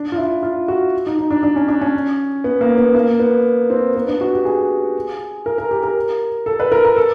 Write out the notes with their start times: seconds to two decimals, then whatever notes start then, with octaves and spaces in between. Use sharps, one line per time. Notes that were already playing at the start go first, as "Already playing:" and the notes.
Already playing: D4
0.12 F4
0.17 E4
0.43 F4
0.68 F#4
1.07 D#4
1.19 D#4
1.30 D4
1.43 D4
1.56 C#4
1.68 D4
1.81 C#4
2.44 B3
2.61 A#3
2.77 B3
2.95 A#3
3.20 B3
3.70 C4
3.96 B3
4.08 D4
4.21 F#4
4.33 G4
4.45 G#4
5.46 A#4
5.58 A#4
5.71 G4
5.83 A#4
6.46 A4
6.60 B4
6.72 A#4
6.85 A#4
6.96 A4